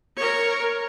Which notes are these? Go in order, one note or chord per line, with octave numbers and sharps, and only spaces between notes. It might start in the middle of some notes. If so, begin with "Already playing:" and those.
A#4 C#5